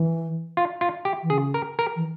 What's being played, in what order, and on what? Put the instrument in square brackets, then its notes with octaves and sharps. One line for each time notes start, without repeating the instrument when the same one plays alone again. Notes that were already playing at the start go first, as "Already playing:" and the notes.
Already playing: [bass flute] E3
[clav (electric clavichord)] F4
F4
G4
[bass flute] E3
[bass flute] C#3 [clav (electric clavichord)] G#4
[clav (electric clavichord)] A#4
A#4
[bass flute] E3